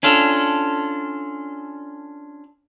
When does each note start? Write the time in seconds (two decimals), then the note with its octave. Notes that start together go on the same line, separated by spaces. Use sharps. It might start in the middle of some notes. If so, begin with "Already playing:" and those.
0.03 C#4 D4 F4 A4